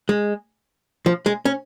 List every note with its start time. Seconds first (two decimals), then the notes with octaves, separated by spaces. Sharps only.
0.09 G#3
1.06 F3
1.26 G#3
1.45 C#4